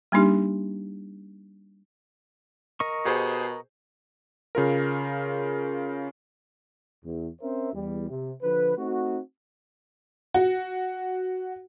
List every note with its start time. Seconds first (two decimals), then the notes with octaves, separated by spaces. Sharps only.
0.12 G3 A#3 D4 D#4 G4
2.80 A#4 D#5 C#6
3.05 B2 G4 G#4 C5
4.55 C#3 F4 A#4
7.05 E2
7.41 C4 C#4 A#4 C5 E5
7.74 E2 G3
8.10 C3
8.43 D3 F3 B4
8.78 A3 C4 D#4 F#4
10.34 F#4